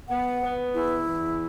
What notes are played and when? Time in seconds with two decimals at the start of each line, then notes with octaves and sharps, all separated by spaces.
0.08 B3 F#5
0.41 B3
0.74 E2 E4
1.07 E2